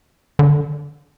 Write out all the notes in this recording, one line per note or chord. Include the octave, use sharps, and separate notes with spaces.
D3